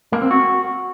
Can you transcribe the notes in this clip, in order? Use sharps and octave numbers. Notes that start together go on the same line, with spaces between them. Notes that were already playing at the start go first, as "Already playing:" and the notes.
A#3
C4
F#4